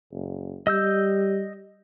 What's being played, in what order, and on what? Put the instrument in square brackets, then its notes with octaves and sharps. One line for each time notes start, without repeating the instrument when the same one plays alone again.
[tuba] F#1
[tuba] G3 [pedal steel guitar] D#5 E6 G6